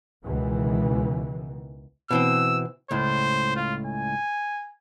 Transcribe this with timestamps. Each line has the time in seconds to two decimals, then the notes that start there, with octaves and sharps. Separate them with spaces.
0.25 C#2 B2 D#3 E3
2.11 B2 E3 C4 E6
2.91 C#2 A2 C5
3.56 F4
3.86 G#5